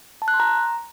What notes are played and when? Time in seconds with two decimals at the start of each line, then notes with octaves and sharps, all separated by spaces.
0.22 A5
0.28 F#6
0.34 C6
0.40 A#5